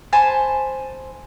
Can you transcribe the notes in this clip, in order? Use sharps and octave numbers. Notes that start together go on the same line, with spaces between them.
C5 G#5 A5 B5